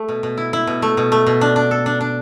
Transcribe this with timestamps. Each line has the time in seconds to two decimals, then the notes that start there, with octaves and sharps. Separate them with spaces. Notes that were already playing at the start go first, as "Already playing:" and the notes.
Already playing: A3
0.09 B2
0.23 B2
0.37 E4
0.53 E4
0.67 B2
0.82 A3
0.97 B2
1.12 A3
1.26 B2
1.41 D4
1.56 D4
1.71 A4
1.86 D4
2.01 D4